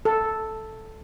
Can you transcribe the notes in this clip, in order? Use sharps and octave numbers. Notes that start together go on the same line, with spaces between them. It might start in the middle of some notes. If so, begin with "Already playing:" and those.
A4